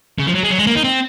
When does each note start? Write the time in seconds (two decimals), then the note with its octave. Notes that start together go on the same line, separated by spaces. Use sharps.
0.18 C#3
0.26 F3
0.34 F#3
0.43 G#3
0.50 F#3
0.58 G#3
0.67 A#3
0.75 D#4
0.84 C4